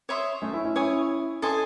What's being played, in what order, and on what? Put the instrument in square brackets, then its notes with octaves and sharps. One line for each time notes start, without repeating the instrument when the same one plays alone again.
[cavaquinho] C#5 E5 C6 D#6
[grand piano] A3 C#4
C#4 E4
C#4 E4
[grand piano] C#4 E4 [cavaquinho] C#5 G#5 D#6
[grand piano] C#4 E4 [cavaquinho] A4 D#5 G#5 C6